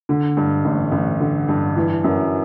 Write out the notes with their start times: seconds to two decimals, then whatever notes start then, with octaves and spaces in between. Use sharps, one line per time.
0.09 D3
0.37 G2
0.65 A1
0.92 A1
1.20 D3
1.48 G2
1.76 E3
2.04 F#2